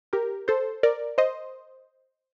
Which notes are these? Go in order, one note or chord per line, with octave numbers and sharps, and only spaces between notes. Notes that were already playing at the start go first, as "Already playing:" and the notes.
G4 A#4
A4 C5
A#4 D5
C5 D#5